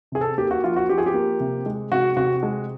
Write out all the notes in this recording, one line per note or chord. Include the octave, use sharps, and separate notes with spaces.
C3 G#4
A4
A#3 G4
F#4
F3 F4
F#4
F3 G4
G#4
G4
A#3
C3
G#3
C3 F#4
C3 F#4
G#3